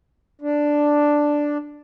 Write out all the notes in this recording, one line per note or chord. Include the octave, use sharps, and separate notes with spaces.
D4